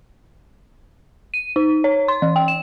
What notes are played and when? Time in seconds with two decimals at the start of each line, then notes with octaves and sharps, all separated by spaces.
1.34 D#7
1.56 D#4
1.84 C#5
2.08 C6
2.22 E3
2.36 G5
2.48 E7